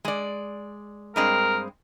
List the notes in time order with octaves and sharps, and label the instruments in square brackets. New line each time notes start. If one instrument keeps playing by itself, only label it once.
[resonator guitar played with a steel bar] G#3 D5
[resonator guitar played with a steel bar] G2 G#3 C4 [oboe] A#4